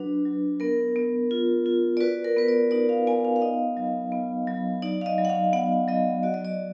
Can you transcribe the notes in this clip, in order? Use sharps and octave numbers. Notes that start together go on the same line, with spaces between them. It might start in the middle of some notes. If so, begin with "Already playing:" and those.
Already playing: F#3 D4 F#4 B4
F#3
B3 A#4
B3
F4
F4
D5
F#4 B4
A#4
B3 B4
D5
D#4 D5
F5
B3 G#5
F5
F5
D#4 D#5
F#3
B3
F#3
D#4 D5
F5
D#5
F#3
F#5
F5
B3 F#5
F#3 D#5
F#4 D5
D#5
D5